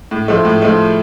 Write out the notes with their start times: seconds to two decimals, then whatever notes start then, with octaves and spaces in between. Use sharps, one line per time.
0.11 A2
0.28 F3 A3
0.45 A2
0.62 F3 A3